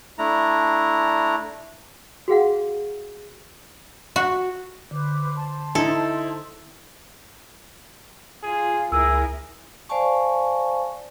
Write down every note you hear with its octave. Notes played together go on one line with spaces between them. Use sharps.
A3 D4 E4 A#5
F#4 G#4 F5 F#5
F#4
D3 B4 C5 D6
C5 A5 C6
D#4 E4 A4
F4 G#4
C#2 E4 G#4 A#4 E6
C5 D5 F5 G#5 A5 C#6